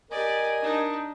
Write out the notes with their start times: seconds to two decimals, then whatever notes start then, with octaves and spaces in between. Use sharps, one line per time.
0.11 G4 A#4 D5 D#5 G#5
0.59 D4 D#4